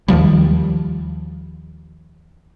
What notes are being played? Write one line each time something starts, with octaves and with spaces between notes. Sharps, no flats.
D#2 D#3 F3 G3